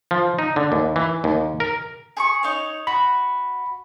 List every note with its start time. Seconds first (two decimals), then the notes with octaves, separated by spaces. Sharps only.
0.11 F3
0.39 D#4
0.56 D3
0.72 D#2
0.96 E3
1.24 D#2
1.60 A#4
2.17 G#4 C6 C#6
2.43 D#4 C#5
2.87 F#4 B5